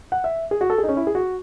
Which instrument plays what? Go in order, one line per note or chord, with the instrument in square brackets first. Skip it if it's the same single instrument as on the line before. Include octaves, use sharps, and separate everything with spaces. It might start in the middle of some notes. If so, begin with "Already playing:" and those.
[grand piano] F#5
E5
G#4
F#4
A4
G#4
D#4
C#4
E4
G#4
F#4